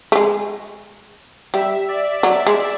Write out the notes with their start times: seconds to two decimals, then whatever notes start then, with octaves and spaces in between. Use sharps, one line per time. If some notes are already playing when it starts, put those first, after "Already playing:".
0.12 A3
0.16 G#3
1.54 G3 E5
1.89 D5
2.23 F#3
2.47 G#3